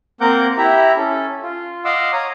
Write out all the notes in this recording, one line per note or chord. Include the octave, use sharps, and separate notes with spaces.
A#3 C4 A#4 F#5 D6 G6
E4 G4 E5 A#5
C#4 A4
F4
D#5 F5 F#5 C6 D6 E6
C#5 A#5 D#6